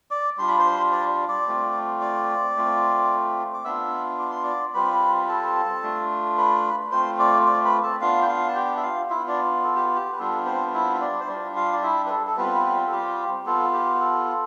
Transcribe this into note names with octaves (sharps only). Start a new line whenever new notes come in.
D5 D6
G3 D4 F4 C6
B5
C5 C6
D5 D6
D5 D6
A3 C4 F4
D5 D6
A3 C4 F4
D6
B3 D4 F4 E5 E6
D6
C6
D5 D6
G3 C4 F4 B4 B5
A4 A5
A3 D4 F4
B4 B5
A3 C4 F4 C5 C6
D5 D6
D5 D6
B4 B5
A4 A5
B3 D4 F4 F5
G5
F4 F5
A5
G4 G5
E5
F4 F5
B3 E4 F4 E5
D4 D5
A4
G4
G4
B4
G3 B3 D4 F4 A4
C4 C5
E4 E5
E5
D4 D5
C5
G3 D4 F4 D5
F4 F5
D5
E4 E5
B4
A4
A4
G3 B3 C4 F4 B4
A4
G4
B3 F4 A4
G4
A4